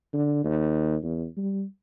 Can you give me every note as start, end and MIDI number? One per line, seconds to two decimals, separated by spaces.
0.13 0.40 50
0.44 0.96 39
1.03 1.26 40
1.37 1.63 55